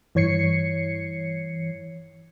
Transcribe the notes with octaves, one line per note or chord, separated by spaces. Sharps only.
G2 E3 C#5 G#6 C7 C#7